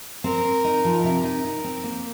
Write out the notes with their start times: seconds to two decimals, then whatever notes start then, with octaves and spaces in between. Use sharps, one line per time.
0.24 C4 A#4
0.45 C4
0.64 D#4
0.85 F3
1.04 C3 A#4
1.24 D#4
1.45 D#4
1.64 C4
1.84 A#3